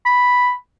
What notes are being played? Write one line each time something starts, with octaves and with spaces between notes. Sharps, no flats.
B5